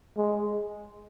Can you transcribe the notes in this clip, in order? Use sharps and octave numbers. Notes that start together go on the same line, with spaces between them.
G#3